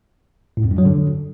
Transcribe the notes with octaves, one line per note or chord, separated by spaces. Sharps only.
A2
F2
G2
F#3
D3